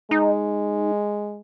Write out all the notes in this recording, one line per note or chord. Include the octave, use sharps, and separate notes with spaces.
G#3 D#4